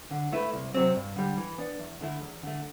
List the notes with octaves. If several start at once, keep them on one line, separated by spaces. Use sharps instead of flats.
D3
A3 E4 B4
C2
C3 F#3 C4
G2
D3 G3
E3
B3 D4
E2
D3 A3 E4
E2
D3 A3